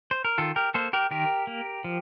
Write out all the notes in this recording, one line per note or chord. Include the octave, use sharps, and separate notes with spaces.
C5
A#4
D#3 F4 A4
G4 A#4
A#3 A4 C5
G4 A#4
D#3 G4 A#4
A#3
F3